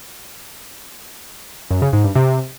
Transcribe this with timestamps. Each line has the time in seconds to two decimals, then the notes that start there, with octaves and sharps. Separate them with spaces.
1.71 F#2
1.82 C#3
1.93 G#2
2.04 G2
2.15 C3